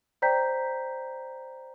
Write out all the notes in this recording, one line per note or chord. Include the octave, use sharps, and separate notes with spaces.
C5 D5 G5 A#5 G6 B6